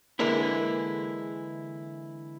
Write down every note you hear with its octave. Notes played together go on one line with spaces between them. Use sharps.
D3 E3 G#3 A#3 D4 E4